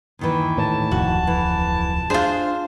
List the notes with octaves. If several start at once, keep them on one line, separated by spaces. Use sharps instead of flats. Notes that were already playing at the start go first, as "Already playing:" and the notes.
D#2 D#3 E3
A2 A5
D1 C2 F2 F#4
E3
D4 F4 G#4 C5